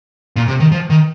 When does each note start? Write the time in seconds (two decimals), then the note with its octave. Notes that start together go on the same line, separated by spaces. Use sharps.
0.36 A#2
0.48 C3
0.60 D#3
0.71 F3
0.90 D#3